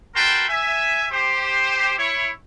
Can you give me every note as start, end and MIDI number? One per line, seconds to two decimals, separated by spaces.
0.15 0.45 66
0.15 0.45 70
0.15 0.45 71
0.15 0.45 79
0.15 0.45 81
0.15 0.45 84
0.49 1.05 76
0.49 1.05 80
1.11 1.93 67
1.11 1.93 72
1.99 2.30 64
1.99 2.30 73